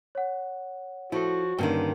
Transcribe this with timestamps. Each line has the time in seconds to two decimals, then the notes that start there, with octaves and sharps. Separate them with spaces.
0.15 C#5 F#5
1.12 F3 E4 F#4 A4
1.59 G2 D3 D#3 A#3 C#4 G5